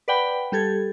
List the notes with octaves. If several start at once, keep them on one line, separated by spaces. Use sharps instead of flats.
B4 D5 F#5 G5 B5
G3 G4 A4 G#6